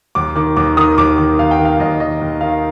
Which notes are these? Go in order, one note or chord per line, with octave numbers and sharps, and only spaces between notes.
D#2 D6
D#3 D6
D#2 D6
D#3 D#6
D#2 D6
D#3
D#2 F5
G5
D#3
F5
D#2 D#5
D#3 D#5
D#2
D#3 F5